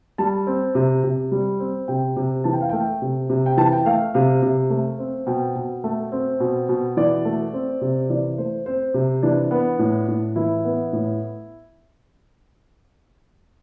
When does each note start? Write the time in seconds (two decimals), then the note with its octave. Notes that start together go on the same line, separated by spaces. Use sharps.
0.18 G3 A5
0.47 C4
0.75 C3
1.04 C3
1.31 G3
1.60 C4
1.88 C3 G5
2.17 C3
2.44 E3 A5
2.53 G5
2.61 F5
2.69 A3 G5
3.02 C3
3.30 C3
3.46 G5
3.57 E3 A5
3.72 G5
3.86 A3 F5
4.14 C3 F5
4.43 C3
4.70 A3
4.99 C4
5.27 B2 G5
5.56 B2
5.84 A3
6.12 C4
6.40 B2
6.69 B2
6.97 E3 D5
7.25 A3
7.53 C4
7.81 C3
8.10 E3 D5
8.38 A3 C5
8.66 C4 C5
8.94 C3
9.23 E3 D4
9.51 B3
9.79 A2
10.08 A2
10.36 E3 E4
10.64 B3
10.93 A2